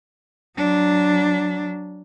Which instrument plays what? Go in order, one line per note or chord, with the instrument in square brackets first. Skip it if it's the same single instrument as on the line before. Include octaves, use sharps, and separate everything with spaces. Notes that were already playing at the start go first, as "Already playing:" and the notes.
[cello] F#3 D4